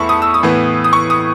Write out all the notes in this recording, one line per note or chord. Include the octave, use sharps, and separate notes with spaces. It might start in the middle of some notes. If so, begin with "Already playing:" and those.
Already playing: E2 A3 E5 A5 B5 C#6
D#6
E6
D#6
A2 E3 B3
D#6
C#6
D#6